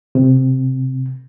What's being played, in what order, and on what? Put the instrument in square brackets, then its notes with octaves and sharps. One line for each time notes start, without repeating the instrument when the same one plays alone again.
[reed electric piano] C3